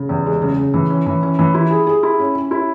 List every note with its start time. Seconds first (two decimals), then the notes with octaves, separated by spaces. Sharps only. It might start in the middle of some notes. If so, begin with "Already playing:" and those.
Already playing: C#3
0.09 E2
0.26 G#3
0.42 C#3
0.58 C#3
0.74 E3
0.90 C#4
1.06 E3
1.23 C#4
1.39 E3
1.54 E4
1.71 G#4
1.87 G#4
2.03 E4
2.19 C#4
2.35 C#4
2.51 E4